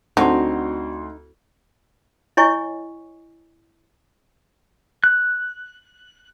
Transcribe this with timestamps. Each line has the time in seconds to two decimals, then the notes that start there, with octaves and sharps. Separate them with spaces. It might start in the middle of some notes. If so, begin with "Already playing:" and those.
0.17 D2 D3 C4 D#4 F#4 C6
2.37 E4 C#5 D#5 G#5 C#6
5.04 F#6